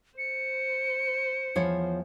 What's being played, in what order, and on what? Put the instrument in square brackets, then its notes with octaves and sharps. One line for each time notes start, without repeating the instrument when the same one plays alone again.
[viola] C5 [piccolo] C#7
[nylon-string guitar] E2 F3 C#5